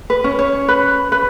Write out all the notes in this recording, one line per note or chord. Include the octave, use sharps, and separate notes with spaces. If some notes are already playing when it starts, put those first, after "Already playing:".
B4
C#4
C#5
B4
B4